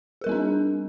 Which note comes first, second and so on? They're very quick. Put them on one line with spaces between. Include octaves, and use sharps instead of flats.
G#4 A#4 G3 C4 D4